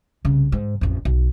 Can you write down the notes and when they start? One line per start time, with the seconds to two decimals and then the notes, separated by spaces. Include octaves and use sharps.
0.25 C2 C#3
0.52 G#2
0.81 A1 F2
1.05 B1